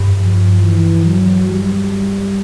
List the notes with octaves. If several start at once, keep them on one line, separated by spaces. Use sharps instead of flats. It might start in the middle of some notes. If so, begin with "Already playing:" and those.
Already playing: G2
F3
E3
F#3
G3